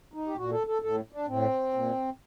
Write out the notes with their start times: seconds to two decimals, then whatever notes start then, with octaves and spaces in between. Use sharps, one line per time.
0.14 D#4
0.27 G4
0.37 A#2 F#4
0.51 A4
0.67 A4
0.82 A2 A4
1.12 D4
1.28 A2 C4
1.73 A#2